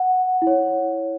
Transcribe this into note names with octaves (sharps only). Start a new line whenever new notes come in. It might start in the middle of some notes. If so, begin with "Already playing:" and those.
Already playing: F#5
E4
C#5